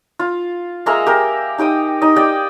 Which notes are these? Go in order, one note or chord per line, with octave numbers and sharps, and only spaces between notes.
F4
G#3 A#3 E5 A#5
G4 A#4
D#4 G4 G5 D#6
D#4 D#5
G4 D5 D#5 G5